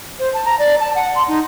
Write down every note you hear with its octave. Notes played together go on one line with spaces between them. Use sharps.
C5
A5
A#5
D5
A5
F#5
C6
D#4